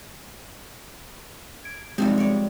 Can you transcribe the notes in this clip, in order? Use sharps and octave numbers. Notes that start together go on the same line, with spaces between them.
G#6 D7
C3 F3 G3 G#3 C4 D#4
G#3 C#5 D5